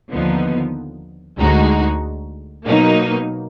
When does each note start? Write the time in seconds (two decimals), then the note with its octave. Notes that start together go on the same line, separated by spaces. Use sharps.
0.10 D#2 D3 F3 B3 D#4
1.38 D2 D3 G#3 D#4 F#4
2.66 B2 F#3 A#3 D#4